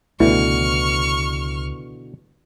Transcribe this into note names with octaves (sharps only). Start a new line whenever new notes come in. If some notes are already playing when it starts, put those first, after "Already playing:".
C#2 B2 D3 E3 A3 E4 C#6 F6